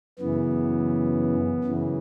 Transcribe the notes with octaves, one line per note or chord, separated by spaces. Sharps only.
F#2 C#3 E3 B3
F#2 C#3 E3